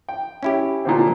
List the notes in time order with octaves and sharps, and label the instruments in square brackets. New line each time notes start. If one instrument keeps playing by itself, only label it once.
[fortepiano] G5
[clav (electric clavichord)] C#4 E4 G4
[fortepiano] A#2 D3 C4